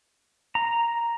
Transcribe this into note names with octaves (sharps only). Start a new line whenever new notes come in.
A#5